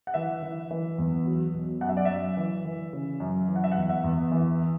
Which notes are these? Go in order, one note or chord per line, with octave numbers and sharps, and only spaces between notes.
F#5
E3 E5
E3
E3
E2
F#3
B2
F#2 F#5
E5
D5
F#2 E5
E3
E3
C#3
F#2
E3
F#5
E5
E2 F#5
E5
E2
E3